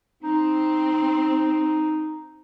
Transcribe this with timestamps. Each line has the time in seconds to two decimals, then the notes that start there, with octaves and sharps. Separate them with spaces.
0.23 C4 D#4